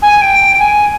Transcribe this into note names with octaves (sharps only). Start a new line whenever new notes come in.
G#5
G#5
G5
G#5